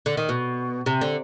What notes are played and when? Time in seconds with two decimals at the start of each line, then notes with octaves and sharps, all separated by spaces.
0.06 D3
0.17 D#3
0.29 B2
0.86 C3
1.01 D3